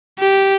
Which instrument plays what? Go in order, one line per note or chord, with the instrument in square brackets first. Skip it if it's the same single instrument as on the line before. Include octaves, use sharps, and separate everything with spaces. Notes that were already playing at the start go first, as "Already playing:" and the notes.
[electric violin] G4